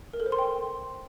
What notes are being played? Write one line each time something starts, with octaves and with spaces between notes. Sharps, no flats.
A#4
A4
C5
C6
G5